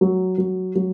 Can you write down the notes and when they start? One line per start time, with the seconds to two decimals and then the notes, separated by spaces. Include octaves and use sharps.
0.01 F#3
0.38 F#3
0.75 F#3